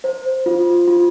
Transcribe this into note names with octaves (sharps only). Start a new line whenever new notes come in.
C5
F4
F4